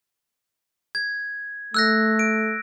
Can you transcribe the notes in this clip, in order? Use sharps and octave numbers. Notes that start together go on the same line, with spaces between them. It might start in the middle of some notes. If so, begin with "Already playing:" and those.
G#6
A3 E6 F#6 A#6
D7